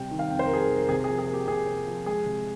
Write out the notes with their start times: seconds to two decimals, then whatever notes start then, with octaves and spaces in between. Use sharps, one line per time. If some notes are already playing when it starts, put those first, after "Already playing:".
Already playing: C3 G3 G5
0.11 D#3
0.19 F5
0.30 F2 G5
0.39 C5
0.46 A#4
0.50 G3 G#4
0.59 A#4
0.70 C3
0.75 A#4
0.89 C3 G#4
1.04 G#4
1.09 F3
1.19 G#4
1.28 A#3
1.33 G4
1.48 C3 G#4
1.67 C3
1.87 F3
2.06 G#3 G#4
2.26 C3